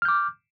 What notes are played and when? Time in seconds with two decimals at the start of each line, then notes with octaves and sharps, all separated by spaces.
0.02 F6
0.05 G6
0.08 D6